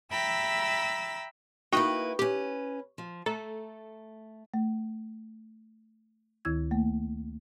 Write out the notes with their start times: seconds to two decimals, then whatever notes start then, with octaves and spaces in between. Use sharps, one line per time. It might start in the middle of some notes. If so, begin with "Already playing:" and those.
0.12 E5 G5 A#5 B5 E6 A6
1.72 A#3 D#4 E4 F#4 B4 G5 C#6
2.19 C#4 G4 B4
2.98 F3
3.26 A3 A4 A#5
4.54 A3
6.45 D2 D#3 E4 E6 G#6
6.71 A3 A#3